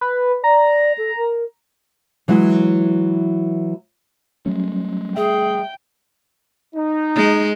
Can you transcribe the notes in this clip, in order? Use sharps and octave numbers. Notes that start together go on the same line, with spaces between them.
B4
D5 A#5
A4
A#4
E3 F#3 G#3 E4
F#3 G3 A3 C#4
G#4 E5 G5
D#4
G#3